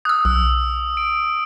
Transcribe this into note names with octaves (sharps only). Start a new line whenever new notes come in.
D#6 E6 F#6
B1 E6
D7